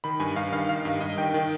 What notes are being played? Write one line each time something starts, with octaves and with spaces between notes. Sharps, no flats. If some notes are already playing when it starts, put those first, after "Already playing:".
D#3 B5
G2 G#5
G2 F5
D#3 F5
D#3 F5
G2
G2 D#5
D#3 G5
D#3